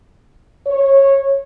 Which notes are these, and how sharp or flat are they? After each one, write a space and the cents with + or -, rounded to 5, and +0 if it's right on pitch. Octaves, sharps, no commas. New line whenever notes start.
C#5 -15